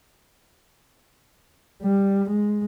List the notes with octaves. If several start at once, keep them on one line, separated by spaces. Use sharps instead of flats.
G3
G#3